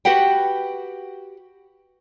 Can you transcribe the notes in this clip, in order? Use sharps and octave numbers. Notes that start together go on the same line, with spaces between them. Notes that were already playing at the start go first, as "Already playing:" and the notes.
F#4 G4 B4 F#5 G5